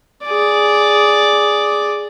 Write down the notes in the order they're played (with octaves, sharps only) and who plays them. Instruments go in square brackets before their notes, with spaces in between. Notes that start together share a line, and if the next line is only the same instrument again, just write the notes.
[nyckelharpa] G#4 D5